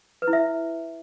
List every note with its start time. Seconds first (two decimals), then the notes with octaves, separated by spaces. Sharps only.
0.22 B4
0.27 E4
0.33 E5